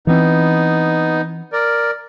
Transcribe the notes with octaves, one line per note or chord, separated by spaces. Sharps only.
E3 B3 C4 D#4
A#4 D5